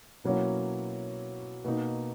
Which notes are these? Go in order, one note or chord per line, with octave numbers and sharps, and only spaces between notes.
B2 F#3 A#3 C#4 E4
B2 A#3 D#4